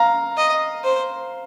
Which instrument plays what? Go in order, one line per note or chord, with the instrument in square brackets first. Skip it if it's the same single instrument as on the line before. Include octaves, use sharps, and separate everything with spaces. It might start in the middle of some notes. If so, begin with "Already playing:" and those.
Already playing: [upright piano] F5 A#5
[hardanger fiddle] D#5
C5